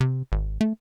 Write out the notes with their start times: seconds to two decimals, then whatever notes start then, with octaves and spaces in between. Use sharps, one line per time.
0.01 C3
0.32 G#1
0.61 A3